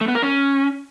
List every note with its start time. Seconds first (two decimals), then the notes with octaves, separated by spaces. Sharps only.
0.01 A3
0.08 B3
0.15 A#4
0.22 C#4